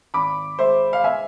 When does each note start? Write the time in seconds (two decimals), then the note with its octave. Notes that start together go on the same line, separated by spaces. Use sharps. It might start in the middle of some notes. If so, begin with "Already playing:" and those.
0.14 G#1 B5 D6
0.59 G#3 C5 E5
0.93 F5
1.04 B3 E5 G#5